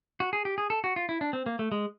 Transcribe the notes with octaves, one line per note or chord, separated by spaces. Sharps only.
F#4
G#4
G4
G#4
A4
F#4
F4
E4
D4
C4
A#3
A3
G#3